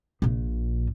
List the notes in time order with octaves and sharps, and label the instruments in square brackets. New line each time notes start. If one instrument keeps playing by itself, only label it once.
[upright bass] A#1 A#2